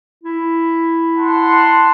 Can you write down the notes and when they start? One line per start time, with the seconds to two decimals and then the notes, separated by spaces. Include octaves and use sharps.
0.23 E4
1.18 F#5 A5 C6